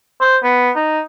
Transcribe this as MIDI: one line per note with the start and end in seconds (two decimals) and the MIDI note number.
0.21 0.37 72
0.44 0.70 59
0.76 1.00 63